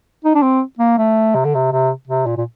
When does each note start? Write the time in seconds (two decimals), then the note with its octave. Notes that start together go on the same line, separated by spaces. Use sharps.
0.25 D#4
0.35 D4
0.42 C4
0.79 A#3
0.98 A3
1.35 C3
1.45 D3
1.55 C3
1.71 C3
2.08 C3
2.26 A#2
2.37 A#2